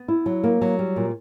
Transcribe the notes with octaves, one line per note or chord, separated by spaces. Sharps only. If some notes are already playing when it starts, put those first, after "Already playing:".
Already playing: B3
E4
F#3
A#3
F#3
G3
A#2